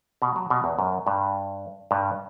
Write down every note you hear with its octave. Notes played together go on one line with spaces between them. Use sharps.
B2
F#3
B2
E2
F#2
G2
G2